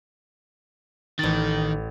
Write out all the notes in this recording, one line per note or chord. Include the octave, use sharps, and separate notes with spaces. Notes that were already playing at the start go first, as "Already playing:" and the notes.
A1 D#3 A6